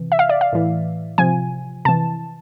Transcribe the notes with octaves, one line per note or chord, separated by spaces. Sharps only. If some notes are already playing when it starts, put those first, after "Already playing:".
Already playing: C3 E3
E5
F5
D5
F5
A2 E3
C3 F3 G#5
C3 E3 A5